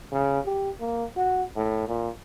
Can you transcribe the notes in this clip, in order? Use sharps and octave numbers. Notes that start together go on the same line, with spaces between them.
C#3
G4
A#3
F#4
A2
A#2